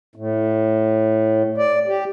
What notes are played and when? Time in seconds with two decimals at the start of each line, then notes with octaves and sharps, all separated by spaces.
0.15 A2
1.58 D5
1.87 G4